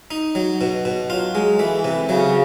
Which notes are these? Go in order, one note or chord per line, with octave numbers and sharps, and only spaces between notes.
D#4
F#3
B2
B2
F#3 F4
G#3
E3 A3
C3
C#3 F#3